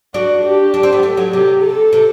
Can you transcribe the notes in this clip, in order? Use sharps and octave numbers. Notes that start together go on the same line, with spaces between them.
D4 F#4
G4
D4
C4
B3
A3
F#3
C3 G4
A4
C3